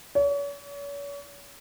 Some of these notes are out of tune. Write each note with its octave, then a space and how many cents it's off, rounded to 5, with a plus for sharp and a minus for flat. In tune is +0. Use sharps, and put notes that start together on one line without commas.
C#5 +40